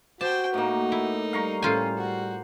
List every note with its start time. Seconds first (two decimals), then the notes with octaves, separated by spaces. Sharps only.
0.21 F#4 G4 C5 G5 A5
0.54 A2 A#3 D#4
0.92 E4
1.33 G3 F5 A#5 C#6
1.62 A2 C#4 F4 C5 G#5
1.97 F#4